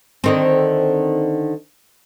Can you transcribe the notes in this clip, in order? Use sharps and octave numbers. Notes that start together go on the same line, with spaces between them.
D3 D#3 C4